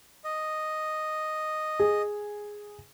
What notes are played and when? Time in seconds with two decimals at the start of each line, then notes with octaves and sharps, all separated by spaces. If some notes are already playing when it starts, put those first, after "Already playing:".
0.24 D#5
1.79 G#4